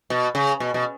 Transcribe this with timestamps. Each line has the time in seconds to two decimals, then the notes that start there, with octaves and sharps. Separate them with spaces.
0.10 B2
0.35 C#3
0.60 B2
0.74 B2